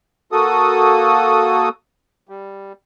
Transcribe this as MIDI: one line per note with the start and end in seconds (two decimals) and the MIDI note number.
0.32 1.69 58
0.32 1.69 66
0.32 1.69 69
0.32 1.69 87
2.29 2.73 55